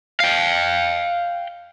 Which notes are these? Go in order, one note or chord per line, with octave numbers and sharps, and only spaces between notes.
F5 G5